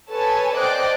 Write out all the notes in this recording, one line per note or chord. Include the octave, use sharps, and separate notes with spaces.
A4 B4 C#5 G#5 A5
C5 D5 D#5 G5 F#6 D7